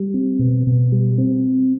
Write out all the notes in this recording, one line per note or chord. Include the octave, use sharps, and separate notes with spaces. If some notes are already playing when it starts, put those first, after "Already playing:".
Already playing: G3
C4
B2
B2
G3
C4